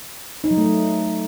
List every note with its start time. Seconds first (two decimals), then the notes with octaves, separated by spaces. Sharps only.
0.44 D#4
0.51 F#3
0.58 A3
0.64 F#3